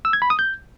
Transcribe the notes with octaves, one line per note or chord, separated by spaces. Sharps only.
E6
G#6
B5
D#6
G6